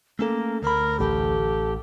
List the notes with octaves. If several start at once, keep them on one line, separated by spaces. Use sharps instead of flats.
A3 A#3 C#4 A4
D2 A#4 B5
A1 G4 A4